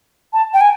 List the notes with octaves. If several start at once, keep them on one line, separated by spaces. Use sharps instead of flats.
A5
G5
G#5